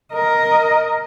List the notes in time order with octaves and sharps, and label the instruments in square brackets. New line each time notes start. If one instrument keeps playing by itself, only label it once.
[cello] A#4 D#5